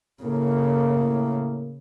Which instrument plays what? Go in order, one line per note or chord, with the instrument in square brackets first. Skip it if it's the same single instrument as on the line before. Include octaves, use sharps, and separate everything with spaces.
[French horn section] A2 A#3 [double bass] C#3